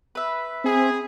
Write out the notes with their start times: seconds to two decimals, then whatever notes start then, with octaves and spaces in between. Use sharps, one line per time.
0.15 B4 E5
0.64 C4 G#4